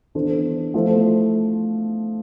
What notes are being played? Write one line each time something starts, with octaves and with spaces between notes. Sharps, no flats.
E3 B3 D4 A4 C5
F3 A3 E4 A4 C5